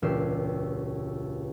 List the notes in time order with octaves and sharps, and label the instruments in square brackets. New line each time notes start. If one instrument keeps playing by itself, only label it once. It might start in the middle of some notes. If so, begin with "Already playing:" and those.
[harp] E1 C#2 A#2 G4 E6 C7